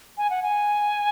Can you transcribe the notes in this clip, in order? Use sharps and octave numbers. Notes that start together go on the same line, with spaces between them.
G#5
F#5
G#5